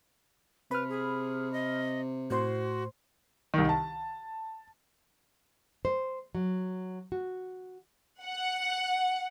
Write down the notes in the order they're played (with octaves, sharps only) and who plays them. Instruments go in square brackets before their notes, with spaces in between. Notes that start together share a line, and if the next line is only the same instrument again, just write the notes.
[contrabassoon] C3 [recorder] B4 [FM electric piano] B5 F6
[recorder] G#4
D#5
[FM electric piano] A2 C5 C6 [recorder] F#4
[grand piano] C2 D#3
A5
[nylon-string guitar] C5
F#3
F#4
[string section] F#5